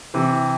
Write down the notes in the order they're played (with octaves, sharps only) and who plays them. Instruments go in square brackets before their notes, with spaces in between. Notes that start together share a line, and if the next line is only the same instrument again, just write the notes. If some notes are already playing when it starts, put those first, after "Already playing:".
[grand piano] C3 E3